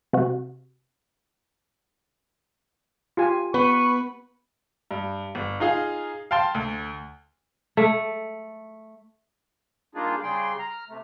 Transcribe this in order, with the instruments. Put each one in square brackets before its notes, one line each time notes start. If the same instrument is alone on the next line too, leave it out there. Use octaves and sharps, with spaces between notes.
[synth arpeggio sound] C3 F#4
[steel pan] F4 G4 G#5
[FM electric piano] B3 [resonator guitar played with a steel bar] B4 [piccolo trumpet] C#6
[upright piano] G2
G1
D#4 F4 G#4 F5
F5 G5 A5 C6
D2
[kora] A3
[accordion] G3 A#3 D4 D#4 F4 G#4
C#3 G3 G#4 G5 C6
A#5 F6
C3 A3